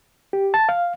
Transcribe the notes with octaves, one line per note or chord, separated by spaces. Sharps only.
G4
A5
F5